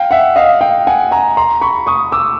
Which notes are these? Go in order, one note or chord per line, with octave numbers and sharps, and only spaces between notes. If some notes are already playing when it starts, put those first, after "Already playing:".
Already playing: F5 G5
E5 F#5
D#5 F5
F5 G5
F#5 G#5
G#5 A#5
A#5 C6
B5 C#6
C#6 D#6
D6 E6